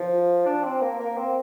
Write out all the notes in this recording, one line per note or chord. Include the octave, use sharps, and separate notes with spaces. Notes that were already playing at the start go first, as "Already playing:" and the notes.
Already playing: F3
D4
C4
A#3
A#3
C4